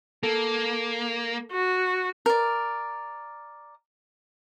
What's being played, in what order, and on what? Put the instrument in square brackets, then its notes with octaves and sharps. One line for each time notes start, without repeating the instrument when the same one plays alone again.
[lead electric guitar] A#3 [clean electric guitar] A4
[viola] F#4
[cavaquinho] A#4 D5